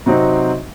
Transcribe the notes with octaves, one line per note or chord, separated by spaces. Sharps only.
C3 F#3 C4 D#4